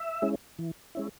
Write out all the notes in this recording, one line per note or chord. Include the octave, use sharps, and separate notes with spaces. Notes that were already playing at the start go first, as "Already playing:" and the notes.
Already playing: E5
G#3 C#4 E4
E3
G#3 C#4 E4